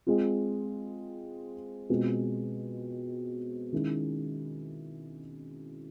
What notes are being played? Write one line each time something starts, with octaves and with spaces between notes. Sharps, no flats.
G#3 C4 F4
B2 G#3 C4 F4 G#4
D#3 G#3 C#4 E4